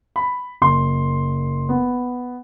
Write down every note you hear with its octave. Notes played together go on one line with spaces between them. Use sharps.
B5
F#1 C6
B3